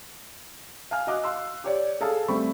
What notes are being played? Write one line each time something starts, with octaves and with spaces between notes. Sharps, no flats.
F5 G#5 F6
F#4 D#5 D6 F#6
F5 C6 E6
G4 C#5 D5
G#4 A4 F5 A5
G3 A3 C4 B5 C#6